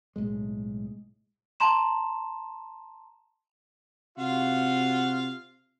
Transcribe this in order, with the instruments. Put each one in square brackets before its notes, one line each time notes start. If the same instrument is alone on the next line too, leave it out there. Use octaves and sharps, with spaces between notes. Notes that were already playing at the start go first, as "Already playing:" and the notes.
[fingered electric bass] B1 F2 A2 G#3
[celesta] A5 A#5 C6 E7
[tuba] C3 [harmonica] F4 F#4 F5